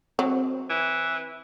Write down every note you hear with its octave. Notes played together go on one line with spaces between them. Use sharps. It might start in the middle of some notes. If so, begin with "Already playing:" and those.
F#3 C4
E3